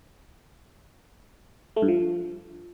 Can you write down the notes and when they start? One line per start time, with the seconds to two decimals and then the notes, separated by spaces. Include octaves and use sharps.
1.76 A3
1.82 G2
1.88 F3